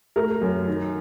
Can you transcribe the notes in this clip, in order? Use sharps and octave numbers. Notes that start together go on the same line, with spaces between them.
A3 A#4
F#2
D#3